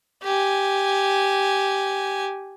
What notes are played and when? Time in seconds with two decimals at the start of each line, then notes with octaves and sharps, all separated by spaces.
0.23 G4 G#5